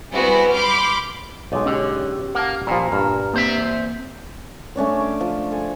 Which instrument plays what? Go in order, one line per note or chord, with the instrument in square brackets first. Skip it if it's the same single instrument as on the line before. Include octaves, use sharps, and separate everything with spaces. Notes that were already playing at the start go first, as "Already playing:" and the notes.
[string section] G3 B3 C4 E4 F#4 G#4
B5 C6 D6 F6 G6
[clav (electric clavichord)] B1 G#3 [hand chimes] C#5 D#5 D6
[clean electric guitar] D3 [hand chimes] C#4 G4
[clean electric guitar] A#3 [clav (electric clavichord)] F#5 A5
[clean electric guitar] A#2 [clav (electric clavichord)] F3 G3
[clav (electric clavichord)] G2 [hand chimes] A#5 F6
[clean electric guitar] E2 C5 E5 [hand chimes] A#3 C4
[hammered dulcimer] A3 C#4 D4 C#5
D6
F3
A4 G#5